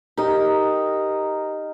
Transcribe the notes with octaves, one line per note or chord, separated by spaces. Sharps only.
D#4 G4 A#4